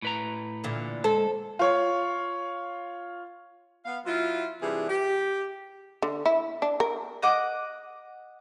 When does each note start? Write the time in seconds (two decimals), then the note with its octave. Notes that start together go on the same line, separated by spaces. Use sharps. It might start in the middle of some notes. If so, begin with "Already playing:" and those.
0.02 A2 B4 A#5
0.64 A#2 D3 E3
1.04 G#3 A4 C5
1.59 F4 C#5
3.85 B3 F5
4.06 F#3 E4 F4
4.62 C3 E3 G3 D4 G#4
4.88 G4
6.02 D3
6.26 E4
6.62 D4
6.80 A#4
7.23 D#5 F#5 D6